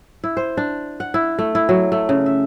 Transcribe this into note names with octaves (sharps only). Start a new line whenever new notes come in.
E4
C5
D4
F#5
E4
A3
E4
F#3
A3
C#3
E5